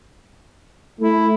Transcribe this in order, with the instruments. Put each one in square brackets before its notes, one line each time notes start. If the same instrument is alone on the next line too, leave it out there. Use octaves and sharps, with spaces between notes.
[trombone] A3 [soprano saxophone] E4